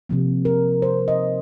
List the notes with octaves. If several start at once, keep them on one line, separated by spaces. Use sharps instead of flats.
C3 F3 A#3
A#4
C5
D#5